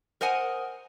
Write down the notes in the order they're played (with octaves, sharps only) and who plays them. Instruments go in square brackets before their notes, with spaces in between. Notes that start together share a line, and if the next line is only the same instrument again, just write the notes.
[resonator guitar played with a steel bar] A#4 C5 D#5 F#5 G#5